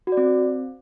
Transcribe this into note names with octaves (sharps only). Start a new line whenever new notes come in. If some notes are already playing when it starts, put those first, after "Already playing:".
F#4
D5
C4